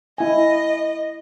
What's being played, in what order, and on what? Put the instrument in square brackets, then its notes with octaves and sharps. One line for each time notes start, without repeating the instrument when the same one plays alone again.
[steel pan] E4 G#5 [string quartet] D#5